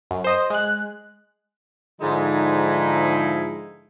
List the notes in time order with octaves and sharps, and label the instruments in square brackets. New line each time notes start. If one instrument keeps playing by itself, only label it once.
[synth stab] F#2
C5 D#5
G#3 F#6
[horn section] G#2 D3 F3 G#3 D#4 E4